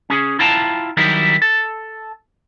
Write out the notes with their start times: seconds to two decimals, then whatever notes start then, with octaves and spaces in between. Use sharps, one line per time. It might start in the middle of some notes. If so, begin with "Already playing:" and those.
0.10 C#4 G#4
0.39 E4 F4 G5 A5 A#5
0.97 D#3 F#3 G3 D#4 E4 G4
1.42 A4